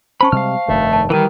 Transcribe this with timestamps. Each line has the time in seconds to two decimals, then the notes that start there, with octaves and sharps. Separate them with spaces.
0.21 C#4 C5 A5 B5 C#6
0.32 C3 G3 G#3 F5 F6
0.68 F1 G2 D#3 A3
0.93 A5
1.10 D#3 E3 G3 A#4 D#7